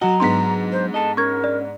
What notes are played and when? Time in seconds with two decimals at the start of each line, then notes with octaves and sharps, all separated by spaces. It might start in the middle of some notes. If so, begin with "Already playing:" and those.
0.01 F#3 F#4 D#5 A#5
0.20 G#2 B3 D4 C6 B6
0.72 C5
0.94 A4 D#5 A5
1.17 C#4 A#4 C#6 G#6
1.44 D5